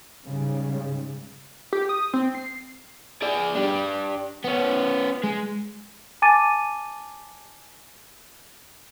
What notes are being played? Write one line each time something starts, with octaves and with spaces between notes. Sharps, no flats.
G#2 C#3 G3
G4
D#6
C4
C7
G#4 D5
D4 G4
B3 C#4
G#3
G#5 A5 D6 A6 D#7